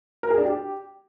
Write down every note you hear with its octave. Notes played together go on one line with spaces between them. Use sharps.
A#4
G#4
D4
G4